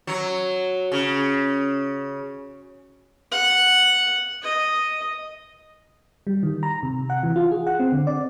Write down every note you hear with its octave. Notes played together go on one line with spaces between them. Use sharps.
F#3
C#3
F#5
D#5
G3
D#3
A#5
C3
F#5
E3
F4
G#4
F#5
C4
D3
D5